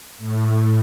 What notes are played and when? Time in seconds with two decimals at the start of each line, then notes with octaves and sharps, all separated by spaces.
0.18 A2